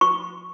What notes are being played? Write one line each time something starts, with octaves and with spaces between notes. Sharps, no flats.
C#6